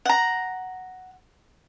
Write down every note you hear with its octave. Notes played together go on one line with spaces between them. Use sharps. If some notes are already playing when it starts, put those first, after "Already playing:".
F#5 A#5